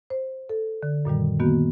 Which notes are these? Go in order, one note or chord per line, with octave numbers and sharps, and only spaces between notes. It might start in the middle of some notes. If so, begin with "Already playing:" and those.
C5
A4
D3
F#2 A#2 D#3 G3
D#3 A#3 B3 F#4